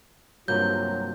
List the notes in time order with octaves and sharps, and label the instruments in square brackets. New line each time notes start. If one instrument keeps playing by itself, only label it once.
[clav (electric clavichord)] G2 C3 A#3 [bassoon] F#3 [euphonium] F4 [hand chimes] G6